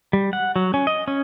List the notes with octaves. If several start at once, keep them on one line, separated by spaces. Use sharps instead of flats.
G3
F#5
F#3
C#4
D#5
C#4